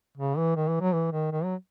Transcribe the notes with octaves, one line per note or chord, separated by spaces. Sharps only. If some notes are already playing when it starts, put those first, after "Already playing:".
C#3
E3
D#3
E3
F#3
E3
D#3
D#3
F#3